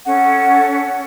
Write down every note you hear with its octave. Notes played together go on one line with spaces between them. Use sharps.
C#4 A4 F#5